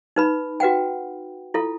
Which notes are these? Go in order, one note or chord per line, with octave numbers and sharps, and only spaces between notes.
D#4 B4 B5
F#4 B4 F#5 G5
E4 F4 A4